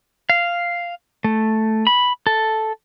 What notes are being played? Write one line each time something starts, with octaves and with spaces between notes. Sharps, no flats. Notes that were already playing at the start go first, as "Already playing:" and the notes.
F5
A3
B5
A4